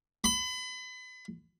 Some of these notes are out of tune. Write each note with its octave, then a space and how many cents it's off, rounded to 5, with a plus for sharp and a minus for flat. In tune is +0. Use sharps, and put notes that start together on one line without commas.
B5 +35